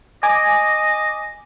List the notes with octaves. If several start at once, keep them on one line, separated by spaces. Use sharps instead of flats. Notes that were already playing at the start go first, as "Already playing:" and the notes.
D#5 G#5 D6